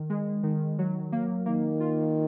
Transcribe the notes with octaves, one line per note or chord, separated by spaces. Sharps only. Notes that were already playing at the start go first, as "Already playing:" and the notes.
Already playing: D#3
G#3
D#3
F#3
A#3
D#3 A#3
F4